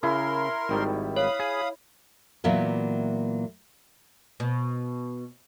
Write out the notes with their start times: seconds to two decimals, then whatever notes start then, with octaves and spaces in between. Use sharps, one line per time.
0.03 C#3 E4 A#4 C6
0.69 G#1 D#3 G3
1.16 C#5 F5 B5 D#6
1.39 G#4
2.44 A#2 E3 F#3 A#3 B3
4.40 B2